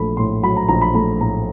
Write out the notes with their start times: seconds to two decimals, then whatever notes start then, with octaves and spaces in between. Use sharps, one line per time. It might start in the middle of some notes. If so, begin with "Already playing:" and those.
Already playing: A#1 F#3 A3 B5
0.17 A2 C6
0.43 F#3 B5
0.56 A#5
0.68 A#1 A#5
0.81 B5
0.94 A3 B5
1.21 A2 A#5